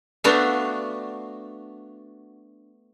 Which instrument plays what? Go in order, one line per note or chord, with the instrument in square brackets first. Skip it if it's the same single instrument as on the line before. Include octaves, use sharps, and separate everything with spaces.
[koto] A3 B3 D4 F#4 F5